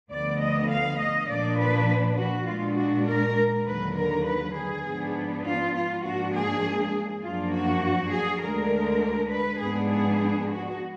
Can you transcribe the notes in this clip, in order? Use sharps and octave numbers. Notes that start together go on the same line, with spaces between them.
D2 D3 F3 B3 D5
D#5
F5
D#5
A#2 F3 A#3 D4 D5
B4
F#4
A#2 G#3 D4 F4
F#4
A#4
D#2 D3 F#3 B4
A#4
B4
G#4
G#2 F3 B3 D4
F4
F4
G#2 F3 A#3 D4 F#4
G#4
F#2 F3 A#3 D4 F4
F#4
G#4
D2 D3 G#3 D4 A#4
B4
G#2 F3 B3 D4 G#4
G#4
F#4